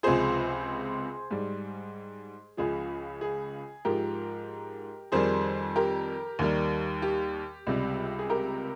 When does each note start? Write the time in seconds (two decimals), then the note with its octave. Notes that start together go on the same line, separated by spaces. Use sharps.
0.03 C#2 C3 F3 G#4 C5
1.31 G#2 G3
2.57 C#2 C#3 F3 G#4
3.21 G#4
3.85 G#2 F3 G4 A#4
5.12 F2 D#3 G3 G#4 C5
5.76 G4 A#4
6.39 D#2 D#3 G3
7.02 G4
7.67 C#2 C3 G3
8.19 G#4
8.30 G4 A#4